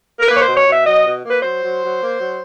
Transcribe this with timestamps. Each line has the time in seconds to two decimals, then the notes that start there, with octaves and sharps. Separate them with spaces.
0.19 A#4
0.27 A#3 B4
0.37 C#5
0.42 B2 C5
0.56 C#5
0.66 B2
0.71 E5
0.85 F#3 D#5
1.04 B2
1.22 A#3
1.30 B4
1.42 F#3 C5
1.61 F#3
1.81 F#3
1.99 A#3
2.19 F#3